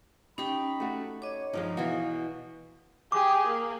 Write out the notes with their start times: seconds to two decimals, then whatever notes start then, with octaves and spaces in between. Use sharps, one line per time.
0.38 C#4 D#4 G4 B5
0.80 A3 F#4
1.22 C#5 D#5 D6
1.53 G2 F3 G#3 D#4
1.77 B2 E3 F#4 F5
3.12 G4 G#4 D6
3.47 A#3